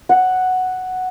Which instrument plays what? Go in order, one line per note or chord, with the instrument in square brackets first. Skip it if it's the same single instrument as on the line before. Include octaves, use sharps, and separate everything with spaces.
[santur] F#5